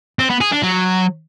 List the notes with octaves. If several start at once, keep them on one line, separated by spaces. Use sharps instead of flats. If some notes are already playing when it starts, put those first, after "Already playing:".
C4
B3
G#4
D4
F#3